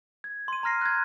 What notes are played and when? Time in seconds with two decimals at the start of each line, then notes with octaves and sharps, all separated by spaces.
0.24 G#6
0.48 C6 D#7
0.63 A#5 C6 F6 A#6 C7
0.81 F#6 G#6